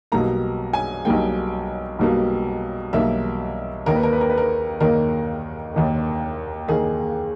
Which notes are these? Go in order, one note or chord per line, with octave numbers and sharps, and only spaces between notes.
B1 B2 G3 A#3 A#5
G#5
B1 B2 G3 A#3 G5
B1 B2 G3 A#3
B1 B2 G3 A#3 E5
D#2 D#3 A#3 A#4
B4
A#4
B4
A#4
B4
A#4
D#2 D#3 A#3 A#4
D#2 D#3 A#3
D#2 D#3 A#3 G#4